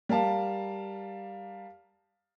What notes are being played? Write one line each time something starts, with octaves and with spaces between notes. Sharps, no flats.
G3 A#4 F5 A5